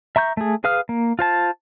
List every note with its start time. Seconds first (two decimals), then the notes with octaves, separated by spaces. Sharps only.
0.16 E5 A#5 C#6 G6
0.37 A3 G#4
0.64 G#4 B4 F5 D#6 F6
0.89 A#3
1.19 F4 C5 A5